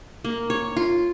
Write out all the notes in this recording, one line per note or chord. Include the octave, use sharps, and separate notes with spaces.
A#3
C#5
F4